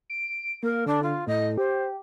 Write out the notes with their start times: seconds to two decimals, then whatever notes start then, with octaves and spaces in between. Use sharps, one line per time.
0.10 D7
0.63 A#3 A#4
0.86 D3 D4
1.02 F4
1.27 A2 D#5
1.57 G4 C5